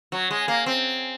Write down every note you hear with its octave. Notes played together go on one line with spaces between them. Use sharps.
F#3
G#3
A#3
C4